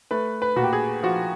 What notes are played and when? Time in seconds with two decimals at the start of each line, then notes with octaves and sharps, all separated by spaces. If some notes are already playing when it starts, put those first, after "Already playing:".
0.11 A3 B4
0.42 B4
0.56 A#2 F#4
0.64 G4
0.73 G#4
1.03 F3 F#4